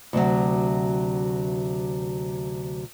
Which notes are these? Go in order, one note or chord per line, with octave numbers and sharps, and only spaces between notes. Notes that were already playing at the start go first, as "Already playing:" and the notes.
D2 C3 F#3